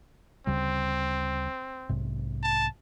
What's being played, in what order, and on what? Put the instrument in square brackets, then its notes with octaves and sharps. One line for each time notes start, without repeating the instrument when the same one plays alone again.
[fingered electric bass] D2 C#3 G3 [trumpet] C4
[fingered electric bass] B1 G#2 C3
[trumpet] A5